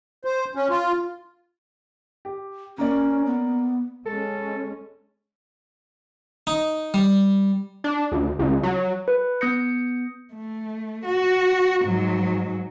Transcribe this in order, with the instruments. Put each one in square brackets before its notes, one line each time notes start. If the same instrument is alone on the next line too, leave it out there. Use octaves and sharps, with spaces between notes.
[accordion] C5
C#4
F4
[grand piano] G4
[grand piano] A#3 D5 [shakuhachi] C#4
[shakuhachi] B3
[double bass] G#3 C#4 [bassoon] A4
[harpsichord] D#4
G3
[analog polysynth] D4
D2
C#2
F#3
[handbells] B4
B3 D#6 G6 A#6 C#7
[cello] A3
F#4
G#2 F#3